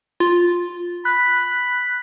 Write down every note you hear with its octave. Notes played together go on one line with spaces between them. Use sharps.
F4
B5 F#6